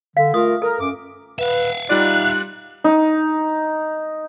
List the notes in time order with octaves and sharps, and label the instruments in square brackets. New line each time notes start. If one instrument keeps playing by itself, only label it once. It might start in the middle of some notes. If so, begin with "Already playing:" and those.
[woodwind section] D3 [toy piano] F5
[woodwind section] A3 F4 A#4 [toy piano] D#6
[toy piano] A4 [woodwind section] A#4
[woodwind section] F#2 D6
[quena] B4 [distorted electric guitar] E5 F5
[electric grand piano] G3 F4 D5 [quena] D#4 [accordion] F#6
[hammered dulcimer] D#4